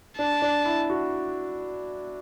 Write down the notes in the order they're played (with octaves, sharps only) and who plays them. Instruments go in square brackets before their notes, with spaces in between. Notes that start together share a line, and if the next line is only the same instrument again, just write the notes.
[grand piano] D4 [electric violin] A5
[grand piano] D4
E4
F#4